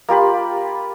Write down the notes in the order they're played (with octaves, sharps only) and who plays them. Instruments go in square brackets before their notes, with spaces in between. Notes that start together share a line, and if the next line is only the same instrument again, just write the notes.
[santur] A#3 F4 G4 B5